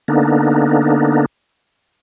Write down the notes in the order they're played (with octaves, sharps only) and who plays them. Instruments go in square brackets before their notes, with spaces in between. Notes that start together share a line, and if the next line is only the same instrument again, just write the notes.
[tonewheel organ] D3 A#3 B3 D4 D#4